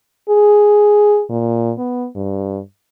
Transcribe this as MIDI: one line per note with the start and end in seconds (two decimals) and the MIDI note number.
0.30 1.23 68
1.30 1.73 46
1.78 2.07 59
2.16 2.60 43